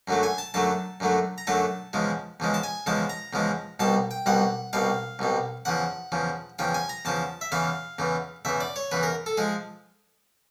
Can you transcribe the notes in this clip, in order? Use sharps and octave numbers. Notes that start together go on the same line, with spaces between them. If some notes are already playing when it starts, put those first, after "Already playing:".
F#2 D3 F#3 A3
G#5
A5
F#2 D3 F#3 A3 A5
F#2 D3 F#3 A3
A#5
F#2 D3 F#3 A3 A5
E2 C#3 F3 G#3
E2 C#3 F3 G#3
A5
G#5
E2 C#3 F3 G#3 A5
A#5
E2 C#3 F3 G#3
C2 B2 G3 A5
G5
C2 B2 G3 F#5
C2 B2 G3 F5
C2 B2 G3
E2 C#3 F3 F#5
E2 C#3 F3
E2 C#3 F3 G5
G#5
A#5
E2 C#3 F3 A5
E5
E2 C#3 E3 F5
E2 C#3 E3
E2 C#3 E3 E5
D5
C#5
E2 C#3 E3 B4
A#4
A4
F3 G#3 G#4